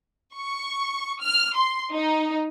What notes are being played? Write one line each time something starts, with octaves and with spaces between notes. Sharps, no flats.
C#6
F6
C6
D#4